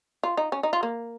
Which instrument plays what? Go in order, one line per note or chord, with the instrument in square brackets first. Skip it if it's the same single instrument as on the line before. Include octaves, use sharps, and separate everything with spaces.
[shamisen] F4
D#4
C#4
D#4
F4
A#3